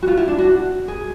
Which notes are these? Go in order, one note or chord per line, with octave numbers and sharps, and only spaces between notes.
F#4
F4
E4
D4
F#4
G#4